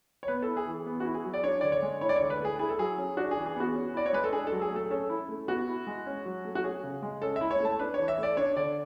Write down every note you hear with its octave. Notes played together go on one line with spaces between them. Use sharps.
C#5
B3 B4
E4 A4
G#4
E3
B3
F#4
E4
G#4
F#3
D5
D4 C#5
D3 D5
C#5
G#3
E4 C#5
D5
D3 C#5
B4
A3 G#4
E4 G#4
A4
F#3 G#4
C#4
D4 F#4
G#4
E3
G#4
B3 F#4
C#4
E4 D5
C#5
G#3 B4
A4
D4 G#4
A4
F#3
G#4
A3 A4
C#4 A4
E4
A3
B3 F#4
E4
G#3
C#4
F#3
A3
F#4
C#4 G#4
C#3
G#3
C#4 A4
E5
E4
C#5
A3 A5
D4 B4
E3 C#5
E5
A3 D5
D4 C#5
D3 D5